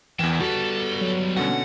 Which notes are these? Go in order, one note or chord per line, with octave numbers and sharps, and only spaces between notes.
E2 E3 A#4 G5 E7
G3 B3 F#4 A4
F#3
B2 D3 C#4 F#5